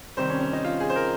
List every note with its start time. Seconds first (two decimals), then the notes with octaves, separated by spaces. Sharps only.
0.17 C3 D#3 G3 C5
0.29 C#4
0.40 C#4
0.53 D#4
0.64 F4
0.80 G#4
0.90 C5
0.96 A#4